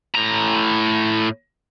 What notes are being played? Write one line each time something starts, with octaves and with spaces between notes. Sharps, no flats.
A2 A#5